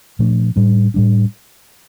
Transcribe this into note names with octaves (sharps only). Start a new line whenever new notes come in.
A#2 F3 A3 D4
A2 G3 D4
A2 G3 D4